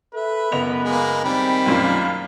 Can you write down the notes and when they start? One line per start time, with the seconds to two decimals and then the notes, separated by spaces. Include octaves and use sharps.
0.15 A4 B4 E5
0.52 F#1 B3 D#5 F7
0.84 G#3 A#3
1.24 D#3 G3 C4 B5
1.66 B1 F#2 A#2 F5